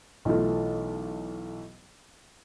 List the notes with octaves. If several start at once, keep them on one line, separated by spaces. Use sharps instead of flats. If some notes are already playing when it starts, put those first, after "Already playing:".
B1 E3 A3 F4